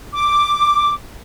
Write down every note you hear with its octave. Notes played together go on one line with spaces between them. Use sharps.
D6